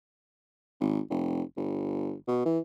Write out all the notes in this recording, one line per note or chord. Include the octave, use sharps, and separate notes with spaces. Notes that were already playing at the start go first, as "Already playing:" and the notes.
G#1
F1
G1
B2
E3